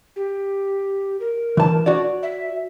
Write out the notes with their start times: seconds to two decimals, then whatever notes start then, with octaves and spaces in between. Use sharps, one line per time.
0.16 G4
1.20 A#4
1.57 E3 A5
1.86 F#4 C#5 D5
2.23 E5